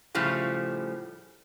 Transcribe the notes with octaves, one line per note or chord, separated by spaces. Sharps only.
A2 C#3 F3 G3